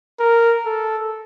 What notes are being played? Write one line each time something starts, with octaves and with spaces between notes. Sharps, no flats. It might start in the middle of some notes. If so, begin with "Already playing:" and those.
A#4
A4